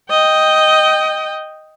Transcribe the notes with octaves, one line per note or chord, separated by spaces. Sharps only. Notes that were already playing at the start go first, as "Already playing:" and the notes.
D#5 G5